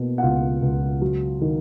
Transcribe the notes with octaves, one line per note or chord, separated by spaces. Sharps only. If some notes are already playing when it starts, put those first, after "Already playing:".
Already playing: B2 A#3 F#4
F#5
C#2 F4 F5
C#2
F#3
D#3